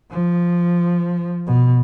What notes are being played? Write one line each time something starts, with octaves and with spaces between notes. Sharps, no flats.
F3
B2